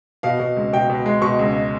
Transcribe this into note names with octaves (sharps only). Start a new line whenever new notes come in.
B2 F5
B2
C#2
B2 G5
B2
G#3
B2 C#6
C#2